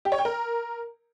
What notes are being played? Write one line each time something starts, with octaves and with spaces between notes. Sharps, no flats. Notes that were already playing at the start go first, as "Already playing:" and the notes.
G4
C#5
G5
A#4